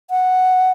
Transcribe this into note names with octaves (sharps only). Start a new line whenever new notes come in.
F#5